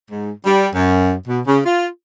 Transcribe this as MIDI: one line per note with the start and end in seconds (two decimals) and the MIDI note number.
0.11 0.32 44
0.45 0.68 55
0.74 1.13 42
1.28 1.41 47
1.47 1.60 49
1.65 1.87 65